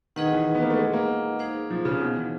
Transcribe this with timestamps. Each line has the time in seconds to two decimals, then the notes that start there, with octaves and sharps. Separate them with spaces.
0.16 D#3 D#4 G#4 B4 D#5 F#5
0.32 E3
0.55 B3
0.62 A#3
0.70 A3
0.77 G#3
0.93 A#3
1.39 D#4 G#4 C5 F5
1.70 F3
1.85 C#3
2.00 B2
2.16 E3